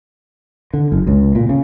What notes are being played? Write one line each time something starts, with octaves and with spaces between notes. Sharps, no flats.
D3
F#1
C#2
A#2
C#3